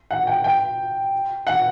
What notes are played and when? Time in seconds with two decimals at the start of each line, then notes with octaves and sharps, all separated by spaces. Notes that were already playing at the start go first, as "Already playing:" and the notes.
0.11 F#5
0.27 G5
0.44 G5
1.47 F#5